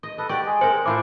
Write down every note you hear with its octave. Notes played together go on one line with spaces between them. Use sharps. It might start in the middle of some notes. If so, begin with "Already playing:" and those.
D#5
A4 B4 D#5
F#4 G4 D5 G5
G#3 G#4
C4 A#4 C5
A2 E4 F4 A4 C5 F5 D6